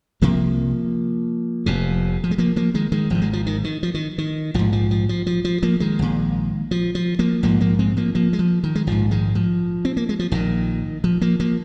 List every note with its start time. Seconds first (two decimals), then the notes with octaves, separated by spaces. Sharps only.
0.22 C2 C3 F3 A#3
1.66 F1 F2 C3
2.24 F3
2.31 G#3
2.38 F3 A#3
2.56 F3 A#3
2.74 D#3 G#3
2.92 D#3 G#3
3.10 G#1 G#2 F3
3.22 G#3
3.33 F3
3.46 D#3
3.64 D#3
3.83 F3
3.94 D#3
4.18 D#3
4.54 A#1 G#2 F3
4.73 F3
4.91 F3
5.09 F3
5.27 F3
5.45 F3
5.63 F3 A#3
5.80 D#3 G#3
5.99 A#1 A#2
6.71 F3
6.95 F3
7.19 F3 A#3
7.43 A#1 G#2 F3 A#3
7.61 F3 A#3
7.79 G#3 C4
7.97 F3 A#3
8.15 F3 A#3
8.33 G#3
8.39 F3
8.64 D#3
8.75 G#3
8.87 A#1 G#2 F3
9.11 D#3 G#3
9.35 F3
9.85 C4
9.97 A#3
10.09 G#3
10.19 F3
10.32 A#1 A#2 D#3
11.04 F3
11.21 F3 A#3
11.40 F3 A#3